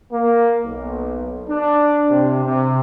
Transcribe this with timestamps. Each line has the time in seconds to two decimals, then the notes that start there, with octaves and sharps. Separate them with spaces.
0.12 A#3
0.64 B1
1.48 D4
2.10 C3
2.44 C3